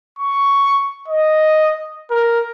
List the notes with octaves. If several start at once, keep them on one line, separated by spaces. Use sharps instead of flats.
C#6
D#5
A#4